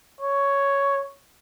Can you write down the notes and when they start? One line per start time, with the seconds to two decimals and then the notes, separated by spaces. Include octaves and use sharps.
0.21 C#5